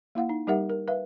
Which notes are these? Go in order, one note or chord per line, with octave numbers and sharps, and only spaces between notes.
A#3 E4 F5 F#5
D#4
G3 D#4 G4 A#4 E5 F#5
A#4
B4 E5 F5